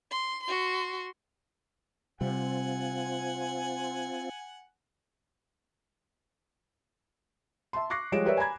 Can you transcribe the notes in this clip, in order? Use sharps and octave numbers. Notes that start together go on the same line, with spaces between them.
C6
F#4 C6
C3 G3 C4 F4 F#5 G#5
E5 A5 C6
C#6 D6 F#6 A#6 C7
F3 G3 G#3 C#5 D7 E7
G4 A#4 B4 C#5 D5 E5
G#5 A#5 B5 G#6